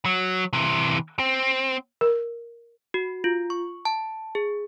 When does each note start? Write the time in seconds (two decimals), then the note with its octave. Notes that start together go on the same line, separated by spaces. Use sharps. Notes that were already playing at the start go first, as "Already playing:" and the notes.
0.05 F#3
0.53 C3 E3
1.19 C4
2.01 A#4
2.94 F#4
3.24 F4
3.50 C#6
3.85 A5
4.35 G#4